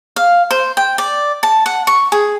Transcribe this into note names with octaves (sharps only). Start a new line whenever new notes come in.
F5
C5
G5
D5
A5
F#5
C#6
G#4